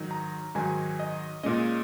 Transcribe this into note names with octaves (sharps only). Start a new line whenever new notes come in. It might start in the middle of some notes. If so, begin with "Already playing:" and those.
Already playing: G#2 D#3 F#3 D#4
A#5
G#2 D#3 F#3 D#4 G#5
D#5
A#2 G#3 C#4 D#5